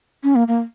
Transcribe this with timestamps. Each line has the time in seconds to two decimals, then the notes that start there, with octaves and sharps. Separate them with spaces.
0.23 C#4
0.35 A#3
0.48 A#3